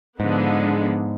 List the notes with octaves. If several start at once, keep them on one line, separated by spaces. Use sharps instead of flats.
G#2 D3 F3 G#3 B3